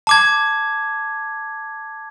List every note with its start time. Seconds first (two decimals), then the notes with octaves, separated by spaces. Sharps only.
0.07 A5 D6 G#6